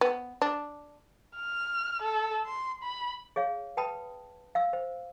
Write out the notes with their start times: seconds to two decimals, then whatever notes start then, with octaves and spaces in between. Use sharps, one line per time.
0.01 B3
0.42 D4
1.36 F6
2.02 A4
2.46 C6
2.83 B5
3.36 G#4 C#5 F5
3.77 B4 G5 A5 B5 D#6
4.55 F5 E6
4.73 C5